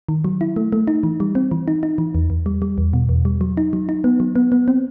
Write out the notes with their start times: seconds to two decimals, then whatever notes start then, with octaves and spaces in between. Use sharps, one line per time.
0.09 D#3
0.25 F#3
0.41 E4
0.56 A3
0.73 A3
0.88 D#4
1.03 E3
1.20 G3
1.35 C4
1.51 E3
1.68 D#4
1.83 D#4
1.98 E3
2.15 E2
2.30 E2
2.46 G3
2.62 G3
2.78 E2
2.93 B2
3.09 E2
3.25 G3
3.41 F#3
3.57 D#4
3.73 F#3
3.89 D#4
4.04 B3
4.20 F#3
4.36 B3
4.52 B3
4.68 C4